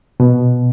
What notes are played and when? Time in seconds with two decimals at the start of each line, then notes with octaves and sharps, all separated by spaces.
0.20 B2